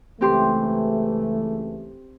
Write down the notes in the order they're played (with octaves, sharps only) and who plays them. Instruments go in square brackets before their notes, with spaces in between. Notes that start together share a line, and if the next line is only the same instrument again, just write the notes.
[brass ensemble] C#2 E3 A3 [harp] C4 G4 C6